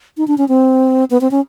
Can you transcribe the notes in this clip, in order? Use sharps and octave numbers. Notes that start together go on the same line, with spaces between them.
D#4
D4
C#4
C4
B3
C4
C#4